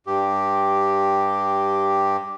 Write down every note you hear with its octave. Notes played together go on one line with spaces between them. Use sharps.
G2 G4